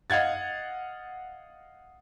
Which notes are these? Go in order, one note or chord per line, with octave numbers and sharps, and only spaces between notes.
D#5 F5 F#5 G#6 A6